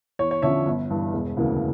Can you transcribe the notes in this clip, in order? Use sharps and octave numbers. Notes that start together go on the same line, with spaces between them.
E2 C#5
C#5
D3 F3 C#4 C#5 E5
G1
G2 E3
E1
D2 C#3 E3 A#3